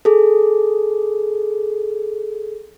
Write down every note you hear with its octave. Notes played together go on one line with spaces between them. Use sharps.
G#4 A4